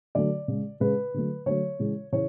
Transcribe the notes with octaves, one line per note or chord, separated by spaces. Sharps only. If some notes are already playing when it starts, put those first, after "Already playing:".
D3 F#3 A3 D5
C#3 G#3
C#3 G#3 B4
D3 F#3 A3
D3 F#3 A3 C#5
C#3 E3 G#3
C#3 E3 C#5